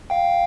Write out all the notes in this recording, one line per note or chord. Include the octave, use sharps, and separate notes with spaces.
F5 G5